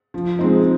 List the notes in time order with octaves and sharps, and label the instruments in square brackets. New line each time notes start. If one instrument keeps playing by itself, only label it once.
[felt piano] F3
G#3 C4 D#4